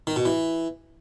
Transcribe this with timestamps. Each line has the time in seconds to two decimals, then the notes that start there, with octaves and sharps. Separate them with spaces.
0.07 D#3
0.16 B2
0.25 E3